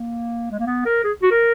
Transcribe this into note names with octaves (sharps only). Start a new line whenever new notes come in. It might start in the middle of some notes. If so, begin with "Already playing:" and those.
Already playing: A#3
G#3
A#3
B3
A#4
G#4
F#4
A#4